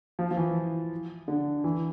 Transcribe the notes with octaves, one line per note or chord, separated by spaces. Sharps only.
F3
F3
E3
D3
E3